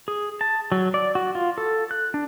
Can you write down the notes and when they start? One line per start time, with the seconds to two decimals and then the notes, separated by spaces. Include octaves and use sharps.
0.08 G#4
0.41 A5
0.72 F#3
0.94 D5
1.15 F#4
1.35 F4
1.58 A4
1.91 F#6
2.14 D4